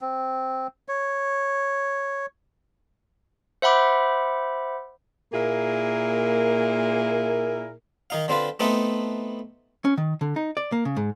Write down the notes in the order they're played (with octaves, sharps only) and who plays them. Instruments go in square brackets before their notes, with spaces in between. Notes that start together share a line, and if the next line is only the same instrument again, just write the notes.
[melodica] C4
C#5
[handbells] C5 E5 F#5 B5 D6
[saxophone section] A#2 A#3 E4 G#4 A#4
[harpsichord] D#3 D#4 F5
D3 C4 F4 B4
A3 B3 C4 D#4 A4 B4
[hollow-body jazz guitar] C#4
D#3
D3
D#4
D5
A#3
C#3
G#2